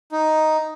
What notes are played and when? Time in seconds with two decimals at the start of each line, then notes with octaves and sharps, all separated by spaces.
0.12 D#4